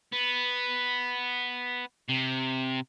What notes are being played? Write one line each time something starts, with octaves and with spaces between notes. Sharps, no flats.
B3
C3